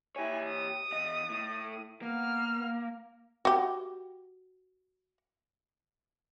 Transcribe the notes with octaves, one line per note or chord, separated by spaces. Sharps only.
E4 G4 C#5 G#5
D#6
E2 D#5
A2
A#3 B3 F6
F#4 G4